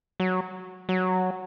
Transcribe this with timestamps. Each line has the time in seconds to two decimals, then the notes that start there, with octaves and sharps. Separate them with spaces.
0.20 F#3
0.89 F#3